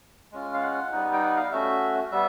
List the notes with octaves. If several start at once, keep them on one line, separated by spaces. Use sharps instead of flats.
G#3 C#4 F4
F5
F#5
G3 B3 D#4
G5
F#5
F5
A3 C#4 F#4 E5
G3 B3 E5